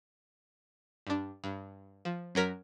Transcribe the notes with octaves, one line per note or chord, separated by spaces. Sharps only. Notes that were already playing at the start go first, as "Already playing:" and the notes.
G2 D4
G2
F3
F#2 F#3 A#4 B6